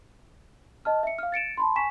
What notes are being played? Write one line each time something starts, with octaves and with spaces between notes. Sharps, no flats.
D#5 A5 F6
E5 C#7
F5 F6
A6 C#7 D7 E7
A5 B5 C6
G#5 C#6 B6 E7